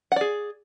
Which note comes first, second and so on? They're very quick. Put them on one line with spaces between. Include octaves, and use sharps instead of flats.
F#5 D5 G#4